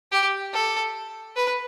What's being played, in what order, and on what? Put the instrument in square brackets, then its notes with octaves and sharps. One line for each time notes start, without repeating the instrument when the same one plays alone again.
[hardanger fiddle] G4
A4
B4